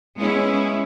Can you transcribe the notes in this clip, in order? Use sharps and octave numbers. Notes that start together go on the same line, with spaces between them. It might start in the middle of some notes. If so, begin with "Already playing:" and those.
G#3 B3 C#4 E4